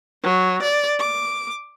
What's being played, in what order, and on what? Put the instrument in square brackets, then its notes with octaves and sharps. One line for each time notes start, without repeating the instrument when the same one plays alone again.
[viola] F#3
D5
D6